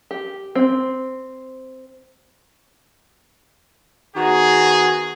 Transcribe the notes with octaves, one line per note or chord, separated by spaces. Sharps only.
G4
C4
D#3 B3 F#4 G#4